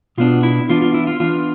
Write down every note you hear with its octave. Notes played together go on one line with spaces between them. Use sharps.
B2 B3 D4 F4
E4
E3 B3 D4 F4
F4
E4
F4
E3 B3 D4 F4